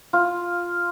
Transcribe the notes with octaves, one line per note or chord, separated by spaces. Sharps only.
F4